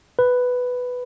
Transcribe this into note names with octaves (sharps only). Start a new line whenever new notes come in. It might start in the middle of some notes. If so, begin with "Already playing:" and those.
B4